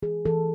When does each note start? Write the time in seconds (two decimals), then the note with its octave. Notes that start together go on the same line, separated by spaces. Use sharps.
0.02 E3 G#4
0.25 E3 A4